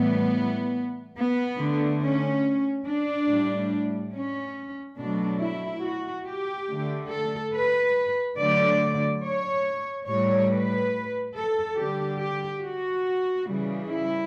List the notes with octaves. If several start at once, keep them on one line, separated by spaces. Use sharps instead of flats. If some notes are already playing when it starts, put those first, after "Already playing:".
Already playing: A2 E3 G3 B3
B3
D3 A3
C#4
D4
A2 G3
C#4
B2 F#3 A3 D4
E4
F#4
G4
D3 A3
A4
B4
D3 F#3 A3 D5
C#5
A2 G3 C#5
B4
A4
D3 G3 G4
G4
F#4
C#3 E3 G3
E4